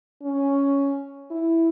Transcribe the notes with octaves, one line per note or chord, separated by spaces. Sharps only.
C#4
E4